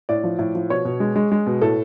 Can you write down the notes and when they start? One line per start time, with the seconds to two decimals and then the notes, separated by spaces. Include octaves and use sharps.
0.09 A2 D5
0.24 F3
0.39 A2
0.55 F3
0.70 B2 C#5
0.85 B2
1.00 G#3
1.16 G#3
1.32 G#3
1.47 B2
1.61 A2 A4